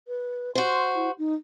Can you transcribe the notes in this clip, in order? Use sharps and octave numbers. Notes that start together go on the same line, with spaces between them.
B4
F#4 C5 C6
E4
D#4